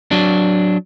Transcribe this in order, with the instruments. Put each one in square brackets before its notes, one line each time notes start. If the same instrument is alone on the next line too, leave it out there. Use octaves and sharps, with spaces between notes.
[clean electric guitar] F#3 D4